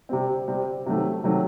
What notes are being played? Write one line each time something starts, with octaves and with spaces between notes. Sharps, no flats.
C3 G3 C4
C3 G3 C4
C3 D#3 F#3 A3
C3 D#3 F#3 A3